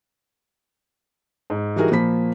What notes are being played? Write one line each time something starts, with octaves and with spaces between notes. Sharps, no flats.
G#2
E3 G3 D#4 F#4 G#4 A#4
A#2 F3 A#3 B5 B6